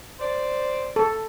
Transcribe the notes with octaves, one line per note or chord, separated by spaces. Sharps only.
C5 D5
A4